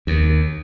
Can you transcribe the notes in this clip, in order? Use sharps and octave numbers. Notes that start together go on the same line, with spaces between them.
D#2